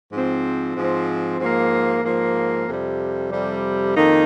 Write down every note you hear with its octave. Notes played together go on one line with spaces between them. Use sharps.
G#2 F3 C4
G#2 F3 C4
G#2 F3 A#3
G#2 F3 A#3
F2 C3 G3
F2 C3 G3
F2 D#3 A#3 D#4